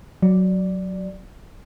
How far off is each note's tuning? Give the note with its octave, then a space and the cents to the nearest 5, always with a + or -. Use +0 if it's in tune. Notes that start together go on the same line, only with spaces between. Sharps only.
F#3 +5 D5 +0